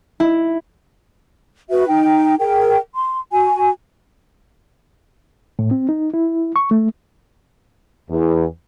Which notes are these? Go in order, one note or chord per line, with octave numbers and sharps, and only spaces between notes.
E4
F#4 B4 E5
D#4 G5
G#4 A#4 G5
C6
F#4 G#5
A2
C4
D#4
E4
C#6
A3
E2